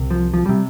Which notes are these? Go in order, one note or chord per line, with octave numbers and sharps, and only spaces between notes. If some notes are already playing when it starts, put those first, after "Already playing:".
Already playing: C2 C3
F3
F3
C3 G3